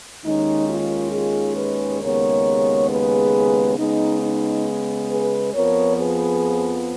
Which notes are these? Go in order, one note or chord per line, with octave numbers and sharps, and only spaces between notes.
D#2 D#3 G#3 C#4 D#4
F4
F4 G#4
G#4 B4
D#2 C#3 G#3 B3 A#4 C#5
G#4 B4
C#3 G#3 B3 D#4
D#4
G#4 B4
F2 F3 B3 A#4 C#5
G#4 B4